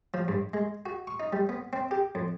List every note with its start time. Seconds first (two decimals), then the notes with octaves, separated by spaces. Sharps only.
0.14 F3
0.28 G2
0.54 G#3
0.86 F#4
1.07 C#6
1.20 D#4
1.33 G3
1.49 B3
1.73 C4
1.91 G4
2.15 F2